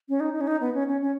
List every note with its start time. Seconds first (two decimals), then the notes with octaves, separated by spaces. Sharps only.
0.09 C#4
0.20 D#4
0.34 D#4
0.41 C#4
0.47 D#4
0.61 B3
0.75 C#4
0.88 C#4
1.02 C#4